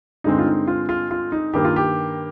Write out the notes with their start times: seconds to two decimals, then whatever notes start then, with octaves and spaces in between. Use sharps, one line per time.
0.24 G2 D3 G#3 C4 D#4
0.39 F4
0.46 D#4
0.68 F4
0.89 F4
1.11 F4
1.32 D#4
1.53 G2 D#3 A#3 G4
1.65 F4
1.76 G4